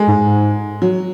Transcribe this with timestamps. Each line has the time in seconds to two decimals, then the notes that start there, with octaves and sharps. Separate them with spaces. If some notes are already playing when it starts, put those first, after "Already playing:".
Already playing: G#3
0.08 G#2
0.22 G#2
0.82 F#3